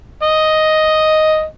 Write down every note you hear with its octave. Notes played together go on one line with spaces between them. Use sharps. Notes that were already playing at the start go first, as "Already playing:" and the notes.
D#5